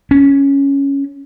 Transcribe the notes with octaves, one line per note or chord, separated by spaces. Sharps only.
C#4